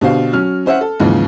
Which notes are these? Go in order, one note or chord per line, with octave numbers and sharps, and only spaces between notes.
B2 D3 G4 C5 F5
F#3 C#4 F6
C#4 C5 E5 F#5
A4
D#2 G#2 C#3 E3 F3